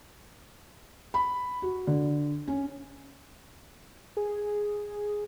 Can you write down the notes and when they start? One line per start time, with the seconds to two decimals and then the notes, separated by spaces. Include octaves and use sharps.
1.14 B5
1.62 F#4
1.87 D3
2.47 C#4
4.17 G#4